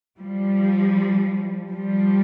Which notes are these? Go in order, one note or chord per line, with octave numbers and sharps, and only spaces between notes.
F3 G3
F3 G3